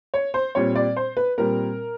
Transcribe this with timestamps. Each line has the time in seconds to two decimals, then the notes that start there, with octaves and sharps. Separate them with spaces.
0.14 C#5
0.34 C5
0.55 A#2 G3 C4 C#5
0.76 D5
0.96 C5
1.17 B4
1.38 A#2 G3 C4 A#4